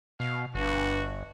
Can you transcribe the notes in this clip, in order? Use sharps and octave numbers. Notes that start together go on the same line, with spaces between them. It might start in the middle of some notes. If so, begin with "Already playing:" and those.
B2 F5
G1 G2 F#4